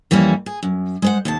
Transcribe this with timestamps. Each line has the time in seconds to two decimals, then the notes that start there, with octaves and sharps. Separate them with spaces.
0.11 F2 E3 G3 A#3 C#4
0.46 G#4
0.63 F#2
1.02 G#3 C5 F#5
1.25 D#2 C3 A5